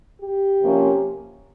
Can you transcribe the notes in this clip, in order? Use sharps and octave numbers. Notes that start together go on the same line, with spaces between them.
G4
C3 F3 A#3 C#4